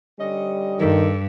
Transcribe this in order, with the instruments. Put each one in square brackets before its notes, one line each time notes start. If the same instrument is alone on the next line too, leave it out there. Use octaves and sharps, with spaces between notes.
[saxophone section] D3 C#4 D#5 [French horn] G3
[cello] G2 [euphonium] D#3 [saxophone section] A4